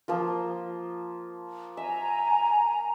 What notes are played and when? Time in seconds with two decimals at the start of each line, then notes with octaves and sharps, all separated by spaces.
0.08 F3 A#3 F4
1.77 E5 G#5 A#5